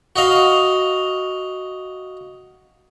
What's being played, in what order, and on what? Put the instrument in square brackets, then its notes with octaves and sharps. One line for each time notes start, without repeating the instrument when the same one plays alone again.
[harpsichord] F#4 D#5 F5